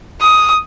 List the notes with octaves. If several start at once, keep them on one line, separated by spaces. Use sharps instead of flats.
D#6